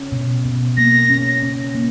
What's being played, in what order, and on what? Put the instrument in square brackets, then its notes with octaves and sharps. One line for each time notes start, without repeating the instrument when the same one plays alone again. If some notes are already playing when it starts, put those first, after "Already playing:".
Already playing: [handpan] C#4
B2
B2
[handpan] A#3 [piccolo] A#6
[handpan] C#4
C#4
A#3